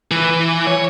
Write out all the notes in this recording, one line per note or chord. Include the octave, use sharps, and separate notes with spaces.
E3
C#5